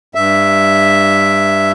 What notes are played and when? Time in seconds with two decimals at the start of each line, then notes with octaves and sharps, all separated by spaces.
0.15 G2 E5